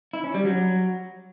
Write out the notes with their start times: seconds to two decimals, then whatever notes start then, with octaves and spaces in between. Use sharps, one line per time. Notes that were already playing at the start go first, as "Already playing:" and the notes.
0.13 E4
0.24 C#4
0.34 G3
0.45 F#3